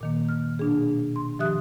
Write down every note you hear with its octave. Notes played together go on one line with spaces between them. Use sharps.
A#2 D#3 A#3
F6
B2 D4 G#4
C6
D#3 F3 G4 E5 D#6 F#6